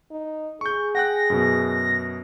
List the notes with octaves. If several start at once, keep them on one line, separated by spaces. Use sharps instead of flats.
D#4
G#4 C#6 G6
F#5 G5 F#6 A#6
F#2 B2